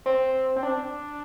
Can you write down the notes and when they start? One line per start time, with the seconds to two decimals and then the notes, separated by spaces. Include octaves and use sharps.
0.06 C4
0.56 C4
0.63 D4